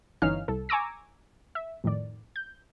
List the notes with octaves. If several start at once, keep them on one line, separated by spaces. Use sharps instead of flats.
G1 E3 C#4 D#4 F5 F6
C2 A4
G#5 A#5 C#6 D6 E6 A#6
E5
F2 A2 D#3 D5
G6